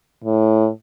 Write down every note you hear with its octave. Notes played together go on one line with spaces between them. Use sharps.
A2